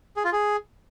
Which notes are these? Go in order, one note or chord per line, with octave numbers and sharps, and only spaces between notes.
G#4
F4
G#4